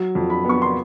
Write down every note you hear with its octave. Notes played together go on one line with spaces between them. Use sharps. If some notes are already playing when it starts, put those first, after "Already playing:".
Already playing: F#3
F2
B5
B3 C#6
C6